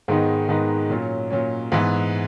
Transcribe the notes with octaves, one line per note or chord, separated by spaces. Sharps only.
G#2 D#3 G#3 B3 D#4
G#2 D#3 G#3 B3 D#4
A#2 F#3 C#4
A#2 F#3 C#4
G#2 E3 B3